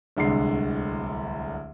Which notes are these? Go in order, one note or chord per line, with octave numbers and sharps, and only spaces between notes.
D1 C2 D3 G#3 C7